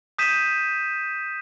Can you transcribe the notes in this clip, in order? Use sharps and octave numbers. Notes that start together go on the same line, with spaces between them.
D#6 G6 B6 D#7 E7